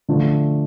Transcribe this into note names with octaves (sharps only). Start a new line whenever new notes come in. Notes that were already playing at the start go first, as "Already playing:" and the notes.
D3 F3 A3 D4